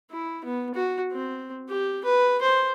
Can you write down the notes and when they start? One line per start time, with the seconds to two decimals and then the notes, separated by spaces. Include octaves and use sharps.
0.11 E4
0.45 B3
0.75 F#4
1.12 C4
1.69 G4
2.05 B4
2.42 C5